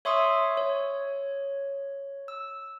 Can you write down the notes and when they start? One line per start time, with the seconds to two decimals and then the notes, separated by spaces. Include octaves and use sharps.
0.05 C#5 E5 C6 C#6 D#6 E6
0.57 C#5
2.28 E6